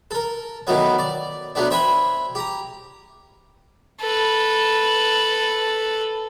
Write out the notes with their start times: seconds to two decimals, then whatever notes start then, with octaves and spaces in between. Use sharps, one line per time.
0.11 A4 A#4
0.67 D#3 E3 F#3 A3 B3 C#4
0.98 D5
1.55 F#3 A3 B3 D4
1.71 C5 E5 G5 G#5 B5
2.35 G4 A#5
4.01 A4 B4